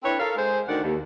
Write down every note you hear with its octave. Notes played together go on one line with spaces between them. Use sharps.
C4 D4 E4 A4 B4 C#5
A4 A#4 F5
G#3 G#4 C5
D2 D3 D#3 F#4 D5 F#5
D#2